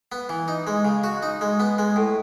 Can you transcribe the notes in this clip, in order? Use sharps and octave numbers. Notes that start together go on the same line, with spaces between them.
B3
E3
D#4
G#3
C#3
F#4
D#4
G#3
B3
G#3
A2